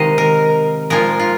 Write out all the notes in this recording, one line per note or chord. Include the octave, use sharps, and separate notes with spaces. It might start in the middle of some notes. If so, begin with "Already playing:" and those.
Already playing: C3 D#3 G#3 D#4 D#5 F5
A#4
A#2 F3 G#3 F4 A#4
F4